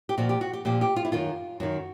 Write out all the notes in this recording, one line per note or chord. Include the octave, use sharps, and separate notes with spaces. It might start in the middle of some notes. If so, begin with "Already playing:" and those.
G4
A#2 F3 F#4
G4
F#4
G4
A#2 F3 G4
G4
F4
E4
F#2 D#3 F4
F#2 D#3 F#4